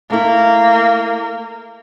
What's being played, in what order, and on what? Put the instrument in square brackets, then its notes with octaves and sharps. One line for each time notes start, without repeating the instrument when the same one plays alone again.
[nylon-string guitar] A3 E4 [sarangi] A#3